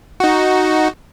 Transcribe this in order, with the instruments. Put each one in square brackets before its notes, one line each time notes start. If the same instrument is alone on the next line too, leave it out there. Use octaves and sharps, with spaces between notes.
[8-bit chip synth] D#4 F#4